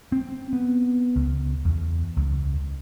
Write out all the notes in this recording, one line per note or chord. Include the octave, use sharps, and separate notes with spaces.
C4
B3
C#2
E2
C#2